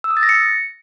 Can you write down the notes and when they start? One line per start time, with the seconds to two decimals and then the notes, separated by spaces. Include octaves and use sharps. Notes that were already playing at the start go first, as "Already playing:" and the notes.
0.04 E6
0.10 D#6
0.17 A6
0.23 A#6
0.29 C#7